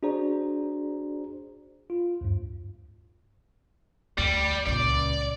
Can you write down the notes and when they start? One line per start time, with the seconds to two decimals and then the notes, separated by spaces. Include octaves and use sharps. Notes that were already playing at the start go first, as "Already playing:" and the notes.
0.03 D4 F#4 G#4 C5 D5 A#5
1.90 F4
2.21 D2 G2
4.18 D2 G3
4.67 C#2 A#2 D5